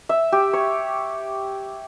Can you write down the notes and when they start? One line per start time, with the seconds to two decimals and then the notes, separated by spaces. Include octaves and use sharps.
0.09 E5
0.32 G4
0.53 C#5